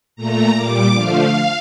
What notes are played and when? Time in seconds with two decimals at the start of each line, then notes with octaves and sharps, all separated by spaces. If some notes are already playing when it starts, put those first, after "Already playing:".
0.16 A#2 A3 A#5
0.54 A#2 G3 D6
0.93 D3 F3 A3 F5